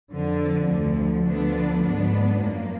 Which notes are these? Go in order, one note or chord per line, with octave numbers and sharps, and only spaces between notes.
F2 D3 F3
D2 D3 F3
D2 D3 F3 B3 D4
G#2 F#3 B3 D4
F#2 F3 A#3